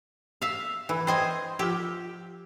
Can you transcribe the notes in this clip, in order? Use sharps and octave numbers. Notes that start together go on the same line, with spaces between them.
E5 F5
E3
C5 D#5 G5 G#5 C6
F3 F4 G4 E5